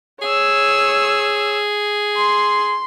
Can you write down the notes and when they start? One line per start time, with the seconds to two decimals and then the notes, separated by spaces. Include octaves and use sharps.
0.22 G#4 C#5 E6
2.17 C6